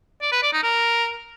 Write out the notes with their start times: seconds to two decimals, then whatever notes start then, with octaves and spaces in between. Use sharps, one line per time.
0.21 D5
0.32 B4
0.42 D5
0.53 D#4
0.63 A#4